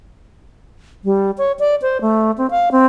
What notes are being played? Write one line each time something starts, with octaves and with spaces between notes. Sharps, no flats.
G3
C#5
D5
C5
A3
C4
F5
C4